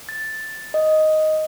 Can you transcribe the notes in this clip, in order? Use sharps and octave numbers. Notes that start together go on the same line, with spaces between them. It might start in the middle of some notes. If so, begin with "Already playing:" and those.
A6
D#5